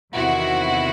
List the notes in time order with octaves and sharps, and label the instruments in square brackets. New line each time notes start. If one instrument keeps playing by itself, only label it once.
[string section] E2 C3 D#3 E4 F#4